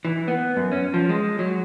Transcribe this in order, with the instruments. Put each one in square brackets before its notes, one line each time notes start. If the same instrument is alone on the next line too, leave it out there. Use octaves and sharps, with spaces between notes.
[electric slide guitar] E3
B3
F#2
C#4
F3
G#3
F#3